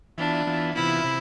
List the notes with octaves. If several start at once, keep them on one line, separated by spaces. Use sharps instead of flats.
E3 B3 D4 F4
E3 B3 F4
C3 E3 B3 E4 F4
C3